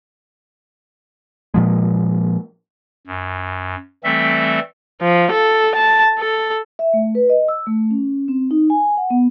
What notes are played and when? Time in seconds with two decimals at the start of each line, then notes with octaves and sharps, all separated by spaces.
1.54 A#2 F3 G#3
3.07 F#2
4.04 E3 G3 A3 C4 A4 E5
5.02 F3
5.32 A4
5.76 A5
6.19 A4
6.79 E5
6.94 A3
7.15 B4
7.30 D#5
7.48 E6
7.67 A3
7.91 C#4
8.28 C4
8.51 D#4
8.70 G#5
8.97 F#5
9.10 B3